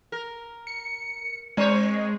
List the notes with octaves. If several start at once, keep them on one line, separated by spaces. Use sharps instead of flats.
A#4
C#7
G#3 C4 C5 C#5